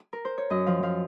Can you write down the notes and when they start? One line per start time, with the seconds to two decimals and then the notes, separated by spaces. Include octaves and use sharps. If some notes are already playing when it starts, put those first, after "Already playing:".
Already playing: G#4
0.13 A#4
0.25 C5
0.38 C#5
0.50 F#2 D#5
0.66 F3 F5
0.83 F3 F5